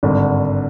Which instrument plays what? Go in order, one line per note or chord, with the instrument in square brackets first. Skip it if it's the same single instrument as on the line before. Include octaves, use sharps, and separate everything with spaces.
[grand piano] G#1 G2 D3